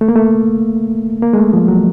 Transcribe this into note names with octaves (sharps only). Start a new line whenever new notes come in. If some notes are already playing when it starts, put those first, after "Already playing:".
A3
A#3
A3
A#3
G#3
A3
F3
F#3